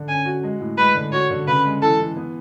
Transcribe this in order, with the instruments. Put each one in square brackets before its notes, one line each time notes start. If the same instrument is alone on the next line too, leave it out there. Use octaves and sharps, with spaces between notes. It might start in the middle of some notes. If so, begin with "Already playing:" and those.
Already playing: [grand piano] D3
[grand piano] C#4 [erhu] G#5
[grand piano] F#4
G#3
A2
[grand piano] G#3 [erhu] B4
[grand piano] D3
[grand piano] F#4 [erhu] C#5
[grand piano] D3
[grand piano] C#3 [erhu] B4
[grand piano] G#3
[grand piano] E3 [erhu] A4
[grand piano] E3
B3